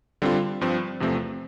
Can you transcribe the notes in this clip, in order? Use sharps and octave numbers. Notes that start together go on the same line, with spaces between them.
D3 G3 C4 F4
G2 F3 C4
E2 C3 F3 A3 C4